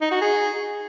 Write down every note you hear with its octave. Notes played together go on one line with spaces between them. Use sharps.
D#4
F#4
G#4